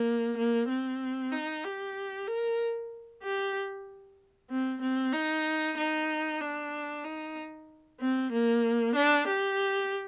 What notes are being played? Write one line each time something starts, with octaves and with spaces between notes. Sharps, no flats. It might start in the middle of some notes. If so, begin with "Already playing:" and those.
Already playing: A#3
A#3
C4
D#4
G4
A#4
G4
C4
C4
D#4
D#4
D4
D#4
C4
A#3
D4
G4